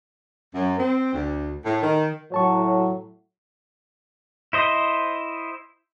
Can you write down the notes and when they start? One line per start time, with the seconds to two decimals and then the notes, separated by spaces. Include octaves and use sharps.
0.55 F#2
0.78 C4
1.13 D2
1.65 A2
1.82 D#3
2.32 A2 F#3 C#5 A5 C#6
4.53 E4 C5 D#5